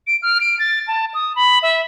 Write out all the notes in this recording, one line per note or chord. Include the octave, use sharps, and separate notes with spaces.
D7
F6
D7
A6
A5
D#6
B5
E5